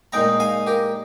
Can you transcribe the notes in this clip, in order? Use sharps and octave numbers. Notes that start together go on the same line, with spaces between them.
A#2 G#3 D#4 G5 A#5
F5 G#5
G4 A#4